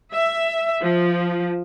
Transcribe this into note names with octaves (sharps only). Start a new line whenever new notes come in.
E5
F3